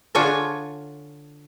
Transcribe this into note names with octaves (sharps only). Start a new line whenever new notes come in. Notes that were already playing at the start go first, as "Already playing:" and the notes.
D3 D4 F4 C#5 G#5 A#5